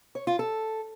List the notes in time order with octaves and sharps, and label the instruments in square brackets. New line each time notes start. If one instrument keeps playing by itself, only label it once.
[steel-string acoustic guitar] C#5
F4
A4